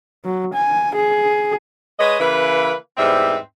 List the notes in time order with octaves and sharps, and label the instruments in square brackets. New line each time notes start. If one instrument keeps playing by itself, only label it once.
[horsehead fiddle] F#3
G#5
G#4
[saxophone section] G#3 B4 C#5 D#5
C#3 E3 A#3 E4 B4
E2 G#2 G3 C4 B4 E5